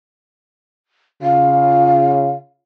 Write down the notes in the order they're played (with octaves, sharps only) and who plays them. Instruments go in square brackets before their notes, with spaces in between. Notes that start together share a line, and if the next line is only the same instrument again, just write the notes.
[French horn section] C#3 F4 [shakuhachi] F5